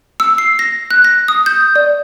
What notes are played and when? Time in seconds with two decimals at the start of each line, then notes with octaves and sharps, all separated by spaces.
0.20 E6
0.38 C7
0.59 A#6
0.91 F#6
1.05 A#6
1.28 D#6
1.46 G6
1.75 D5